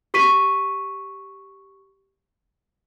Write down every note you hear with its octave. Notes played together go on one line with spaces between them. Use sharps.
G4 C#6 B6 D#7